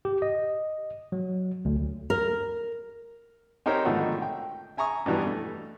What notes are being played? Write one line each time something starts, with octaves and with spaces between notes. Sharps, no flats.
G4
D#5
F#3
D2
A#4
C4 D#4 G4 A#4 C#5
G#2 B2 D3 D#3 F3 A3
G5
E5 G#5 A#5 C#6 D#6
G2 B2 E3 G3
A3